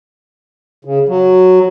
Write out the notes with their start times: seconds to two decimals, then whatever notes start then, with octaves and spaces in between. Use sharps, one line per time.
0.85 C#3
1.09 F#3